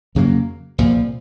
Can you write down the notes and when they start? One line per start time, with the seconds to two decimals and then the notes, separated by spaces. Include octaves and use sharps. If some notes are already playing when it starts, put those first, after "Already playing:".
0.15 F2 C#3 F#3 A#3
0.78 C2 A#2 F3